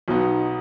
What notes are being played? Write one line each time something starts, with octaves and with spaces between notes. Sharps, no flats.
B1 B2 F#3 B3 D#4